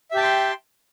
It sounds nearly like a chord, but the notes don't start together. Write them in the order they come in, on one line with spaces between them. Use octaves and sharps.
E5 G4 A5 G5 C6